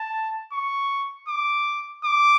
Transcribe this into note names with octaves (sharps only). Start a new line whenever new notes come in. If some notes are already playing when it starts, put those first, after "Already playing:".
Already playing: A5
C#6
D6
D6